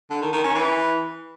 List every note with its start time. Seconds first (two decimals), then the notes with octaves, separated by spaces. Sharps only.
0.10 D3
0.21 D#3
0.33 D#3
0.44 C#4
0.55 E3